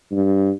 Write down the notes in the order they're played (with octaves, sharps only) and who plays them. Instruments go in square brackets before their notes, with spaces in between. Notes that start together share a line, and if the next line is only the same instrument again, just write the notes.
[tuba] G2